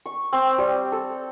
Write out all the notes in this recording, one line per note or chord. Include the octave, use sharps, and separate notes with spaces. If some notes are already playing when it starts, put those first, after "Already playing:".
C#6
C4
G3
A4